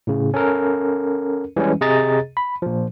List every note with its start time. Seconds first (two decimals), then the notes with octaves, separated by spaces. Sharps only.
0.07 A2 C#3
0.34 C#4 A4 A#4
1.57 E3 G3 G#3 C#4
1.81 C3 G#4 D#5 A#5 A6
2.37 B5
2.62 A#2 F3